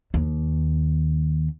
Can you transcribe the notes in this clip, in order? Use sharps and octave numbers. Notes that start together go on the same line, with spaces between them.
D#2